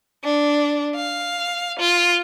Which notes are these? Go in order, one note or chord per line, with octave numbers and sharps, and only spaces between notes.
D4
F5
F4